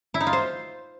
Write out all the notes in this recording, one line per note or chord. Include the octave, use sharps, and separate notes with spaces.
E4
D#4
F4
C5